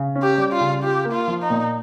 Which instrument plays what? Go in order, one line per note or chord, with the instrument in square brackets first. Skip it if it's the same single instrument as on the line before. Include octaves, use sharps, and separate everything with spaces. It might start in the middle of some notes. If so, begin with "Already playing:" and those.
Already playing: [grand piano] C#3
C#4
[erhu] G4
[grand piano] G3
[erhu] F4
[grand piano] C#3
[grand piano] F4 [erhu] G4
[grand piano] A#3
[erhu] F4
[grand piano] F3
[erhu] D#4
[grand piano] A#2